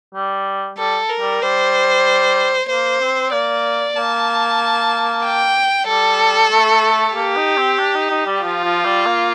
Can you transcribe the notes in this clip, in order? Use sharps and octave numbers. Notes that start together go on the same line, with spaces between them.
G3
G3 A4
A#4
G3
G3 C5
A#3 C5
C4
A#3 D5
A#3 A5
G5
G3 A4
A3
A#3 G4
D#4
C4
D4
D#4
D#4
G3
F3 F4
F3
G3
A#3